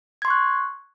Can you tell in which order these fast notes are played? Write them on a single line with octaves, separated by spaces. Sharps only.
G#6 C6 C#6 F#6